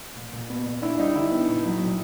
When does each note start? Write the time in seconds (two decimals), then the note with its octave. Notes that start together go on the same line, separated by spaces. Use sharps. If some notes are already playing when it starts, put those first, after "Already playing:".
0.17 A#2
0.33 A#2
0.50 B3
0.66 A#2
0.82 D4 E4
0.99 G3 D#4
1.16 D3 E4
1.31 B3
1.49 A#2
1.65 F#3
1.82 A#2